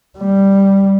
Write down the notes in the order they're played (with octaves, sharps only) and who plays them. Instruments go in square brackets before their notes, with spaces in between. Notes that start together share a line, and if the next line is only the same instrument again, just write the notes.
[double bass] G3